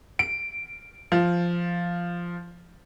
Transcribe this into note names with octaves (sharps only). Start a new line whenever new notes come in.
D7
F3